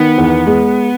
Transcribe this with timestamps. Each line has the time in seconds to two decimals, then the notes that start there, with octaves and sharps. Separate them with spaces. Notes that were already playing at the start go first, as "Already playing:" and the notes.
Already playing: D#3 B3
0.18 E2
0.47 G#3